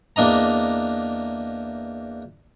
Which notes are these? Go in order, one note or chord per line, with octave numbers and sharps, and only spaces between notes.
E2 A#3 D4 D#5 A#5